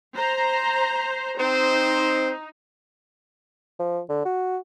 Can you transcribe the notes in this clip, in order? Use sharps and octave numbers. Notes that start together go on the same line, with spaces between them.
C5 A#5
C4 D#4 C5
F3
D3
F#4